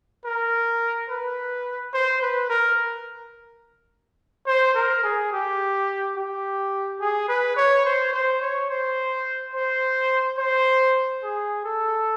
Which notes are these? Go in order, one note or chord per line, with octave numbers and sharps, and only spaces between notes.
A#4
B4
C5
B4
A#4
C5
A#4
G#4
G4
G4
G#4
B4
C#5
C5
C5
C#5
C5
C5
C5
G#4
A4